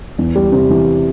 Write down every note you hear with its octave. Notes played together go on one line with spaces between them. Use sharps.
E2
G3
C3
E3